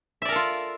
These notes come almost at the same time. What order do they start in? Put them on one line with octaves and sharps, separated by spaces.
E5 D5 A#4 A4 F4